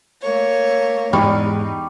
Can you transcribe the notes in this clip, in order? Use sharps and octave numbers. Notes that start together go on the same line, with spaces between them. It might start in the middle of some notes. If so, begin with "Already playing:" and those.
A3 A#3 C#5
E2 G#2 G3 G#3 D#4 C#6